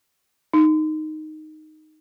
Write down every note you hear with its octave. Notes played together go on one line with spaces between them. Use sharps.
D#4